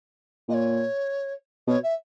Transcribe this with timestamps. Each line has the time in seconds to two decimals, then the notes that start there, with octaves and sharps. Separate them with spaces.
0.48 A#2 D#5
0.53 C#5
1.67 B2 C#5
1.83 E5